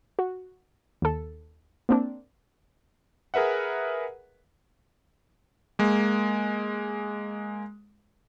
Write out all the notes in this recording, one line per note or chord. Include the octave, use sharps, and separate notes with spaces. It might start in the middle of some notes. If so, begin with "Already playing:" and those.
F#4
D#2 A4
A#3 C4 D4
G#4 A#4 B4 E5 F#5
G#3 A#3